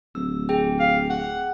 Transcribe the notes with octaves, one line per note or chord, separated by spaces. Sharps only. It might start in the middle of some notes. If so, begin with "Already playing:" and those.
D1 E6
G#4 G5
F5
F#5